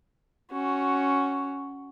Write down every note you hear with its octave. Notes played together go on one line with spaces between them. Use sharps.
C#4 F#4